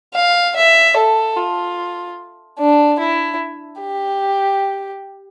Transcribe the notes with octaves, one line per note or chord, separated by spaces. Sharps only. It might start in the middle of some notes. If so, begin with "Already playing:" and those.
F5
E5
A4
F4
D4
E4
G4